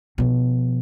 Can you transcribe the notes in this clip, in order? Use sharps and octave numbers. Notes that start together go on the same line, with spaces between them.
B2 F3